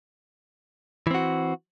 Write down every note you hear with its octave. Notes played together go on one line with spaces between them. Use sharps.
E3 C4 F#4